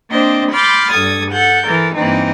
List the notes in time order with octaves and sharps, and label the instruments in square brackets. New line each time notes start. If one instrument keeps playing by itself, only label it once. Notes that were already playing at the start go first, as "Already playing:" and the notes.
[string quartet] A#3 C4 D4 C5 D#5
B5 C6 D6 F6 G6 A6
G2 A4 D#6 G#6
A4 F#5 G6
E3 A4 A#4
G2 E3 A#3 C4 D#4